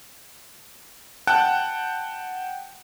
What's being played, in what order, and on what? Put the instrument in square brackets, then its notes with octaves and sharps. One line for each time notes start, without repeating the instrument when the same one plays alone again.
[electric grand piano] F#5 G5 A5 F#6